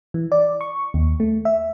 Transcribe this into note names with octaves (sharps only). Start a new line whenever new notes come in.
E3
D5
C#6
D#2
A3
E5